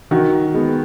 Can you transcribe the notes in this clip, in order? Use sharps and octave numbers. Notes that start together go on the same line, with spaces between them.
D#3 F#4
G#3 B3